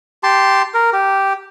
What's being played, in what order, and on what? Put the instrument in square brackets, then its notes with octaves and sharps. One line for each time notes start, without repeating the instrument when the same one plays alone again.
[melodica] G4 A5 C6
A#4
G4